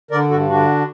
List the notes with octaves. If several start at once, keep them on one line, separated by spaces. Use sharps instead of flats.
D3 A#4 D5
G2 F#4 A4
D3 D4 F#4